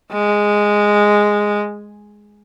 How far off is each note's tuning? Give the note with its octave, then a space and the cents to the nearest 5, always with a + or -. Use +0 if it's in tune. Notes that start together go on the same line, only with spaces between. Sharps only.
G#3 -5